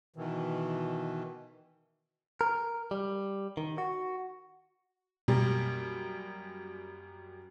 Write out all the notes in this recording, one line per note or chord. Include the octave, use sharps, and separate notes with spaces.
B2 D#3 E3
A#4
G3
D#3
F#4
F#2 B2 G3 A#3